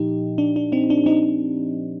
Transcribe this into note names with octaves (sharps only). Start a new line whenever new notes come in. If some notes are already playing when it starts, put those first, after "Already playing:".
Already playing: A#2 F3 D#4 G4
D4
D4
C4 D#4
D4
C4 D#4